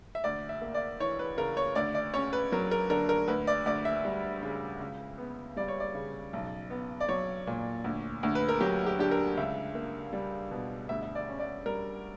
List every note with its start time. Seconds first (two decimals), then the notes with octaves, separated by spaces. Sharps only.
0.15 E5
0.24 D2 D5
0.49 E5
0.62 A#3
0.74 D5
1.00 E3 C#5
1.19 B4
1.37 C#3 A#4
1.57 C#5
1.75 D2 D5
1.95 D5
2.14 C#4 C#5
2.33 B4
2.52 F#3 A#4
2.71 A#4
2.90 D3 A#4
3.09 A#4
3.28 D2 B4
3.47 D5
3.66 D2 D5
3.85 E5
4.05 G3
4.42 C#3
4.80 C#2
5.18 B3
5.57 G3 D5
5.68 C#5
5.80 D5
5.94 C#3
6.33 B1
6.70 B3
7.00 D5
7.09 F#3 C#5
7.47 A#2
7.84 D2
8.23 D2
8.35 B4
8.49 A#4
8.60 F#3 G4
8.86 G4
8.99 D3 G4
9.11 A#4
9.37 C#2 E5
9.75 A#3
10.13 G3
10.51 B2
10.89 D2 E5
11.03 E5
11.15 D5
11.28 C#4
11.40 D5
11.66 G3 A#4